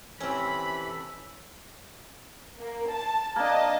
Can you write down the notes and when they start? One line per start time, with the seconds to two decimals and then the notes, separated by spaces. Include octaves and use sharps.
0.20 C3 E3 C4 C#4 A4 B5
2.59 A#3
2.91 A5
3.36 A#3 D4 D#5 A5